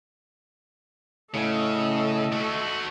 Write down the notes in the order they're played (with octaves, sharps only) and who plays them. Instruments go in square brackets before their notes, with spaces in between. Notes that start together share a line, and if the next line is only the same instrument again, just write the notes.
[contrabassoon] A2 [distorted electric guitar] C#3 [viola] A4 D#5
[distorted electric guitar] A3 F#4